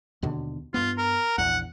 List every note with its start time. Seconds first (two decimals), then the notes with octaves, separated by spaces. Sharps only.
0.22 D#2 B2 D3
0.74 G2 B3 F4
0.98 A#4
1.38 A#1 E2 F#5